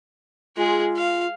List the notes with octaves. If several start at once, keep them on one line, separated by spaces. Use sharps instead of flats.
G#3 F4 G#4
F5